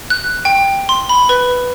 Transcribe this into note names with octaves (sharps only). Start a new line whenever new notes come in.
F#6
G5
C6
B5
B4